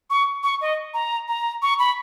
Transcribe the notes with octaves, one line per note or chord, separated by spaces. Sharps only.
C#6
C#6
D#5
A#5
A#5
C#6
B5